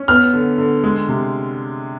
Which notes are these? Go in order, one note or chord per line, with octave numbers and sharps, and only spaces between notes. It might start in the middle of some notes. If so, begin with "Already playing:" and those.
Already playing: C#4
B3 F6
D3
D3
G#3
C3